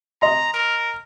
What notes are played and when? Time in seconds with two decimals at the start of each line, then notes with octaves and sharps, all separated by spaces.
0.22 D#5 A#5 C6
0.54 A#4